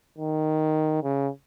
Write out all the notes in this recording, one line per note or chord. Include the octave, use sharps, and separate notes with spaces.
D#3
C#3